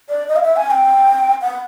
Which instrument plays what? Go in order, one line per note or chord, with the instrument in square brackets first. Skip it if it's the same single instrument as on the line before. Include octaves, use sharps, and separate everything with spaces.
[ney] D5
D#5
F5
E5
G#5
G5
F#5